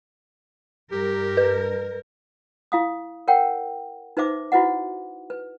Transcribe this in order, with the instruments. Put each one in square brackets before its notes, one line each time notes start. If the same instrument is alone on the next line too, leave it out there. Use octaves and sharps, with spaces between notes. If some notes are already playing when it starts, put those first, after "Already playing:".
[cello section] G2 A#4 [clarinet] G4
[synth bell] B4
[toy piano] E4 F5 D#6
A#4 C#5 F#5 G5
D#4 B4 C5 E5 D6
E4 F#4 B4 D#5 F#5
B4